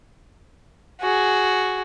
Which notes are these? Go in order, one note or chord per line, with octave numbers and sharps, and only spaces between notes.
F#4 G#4